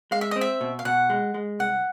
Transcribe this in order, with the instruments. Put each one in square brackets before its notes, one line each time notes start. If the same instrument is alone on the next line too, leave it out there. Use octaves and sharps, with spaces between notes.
[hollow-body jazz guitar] G#3 [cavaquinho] F5
[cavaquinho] E5
[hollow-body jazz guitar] C4 [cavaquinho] D#5
[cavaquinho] E5
[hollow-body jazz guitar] B2
[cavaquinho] F5
[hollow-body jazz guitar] B2 [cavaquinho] F#5
[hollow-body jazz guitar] G#3
G#3
[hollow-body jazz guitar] C2 [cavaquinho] F#5